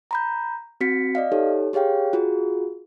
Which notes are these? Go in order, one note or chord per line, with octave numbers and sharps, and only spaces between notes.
A#5 B5 G6
C4 F#4 B6 C#7
D5 D#5 F5
D#4 G4 A4 C#5
G4 G#4 C#5 F5 G5
F4 F#4 G#4